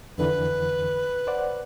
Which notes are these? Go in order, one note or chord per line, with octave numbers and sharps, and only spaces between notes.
F2 D3 E3 B4
C5 D5 F#5